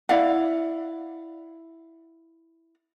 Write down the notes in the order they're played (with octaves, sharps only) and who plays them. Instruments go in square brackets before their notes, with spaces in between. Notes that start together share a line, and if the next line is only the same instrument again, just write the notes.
[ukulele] E4 D5 F5 F#5